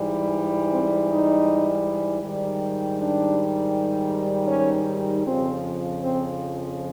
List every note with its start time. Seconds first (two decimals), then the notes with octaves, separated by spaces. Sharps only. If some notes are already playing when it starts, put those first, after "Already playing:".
Already playing: G#2 E3 G3
0.71 C4
1.09 D#4
2.22 G#2 D#3 G3
2.97 D4
4.48 C#4
5.24 F2 C#3 F3 C4
5.99 C4